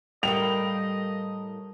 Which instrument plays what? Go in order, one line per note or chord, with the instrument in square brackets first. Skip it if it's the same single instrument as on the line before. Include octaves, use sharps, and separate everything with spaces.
[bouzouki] A2 F5 G5 [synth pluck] G3 A#4 [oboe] D#5 [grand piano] F7